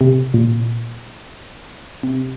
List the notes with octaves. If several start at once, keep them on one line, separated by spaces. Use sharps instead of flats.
C3
A#2
C3